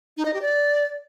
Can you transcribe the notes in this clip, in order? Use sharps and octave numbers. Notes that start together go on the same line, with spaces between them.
D#4
D#5
G4
D5